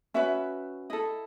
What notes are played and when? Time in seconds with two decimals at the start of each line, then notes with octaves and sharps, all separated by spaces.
0.14 C#4 F#4 B4 E5
0.90 E4 A4 D#5